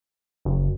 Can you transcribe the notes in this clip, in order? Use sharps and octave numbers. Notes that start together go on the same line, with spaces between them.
F#1